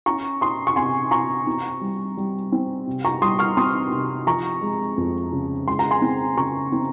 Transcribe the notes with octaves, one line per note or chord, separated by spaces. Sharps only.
C#4 A#5 C#6
C#4 C6 D#6
C#6
C3 G#5 C6
C3 A#5 C#6
C4
G3
G3
C4
C3
A#5 C#6
G3 C6 D#6
C#6 F6
C4 C6 D#6
C3
F3 A#5 C#6
G#3
F2
C#3
G#3 C6
A#5
G#5 C6
C4
C#3 A#5 C#6
C4